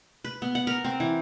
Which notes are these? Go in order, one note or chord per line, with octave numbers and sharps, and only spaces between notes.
B4
B3
F#5
A#4
C4
E3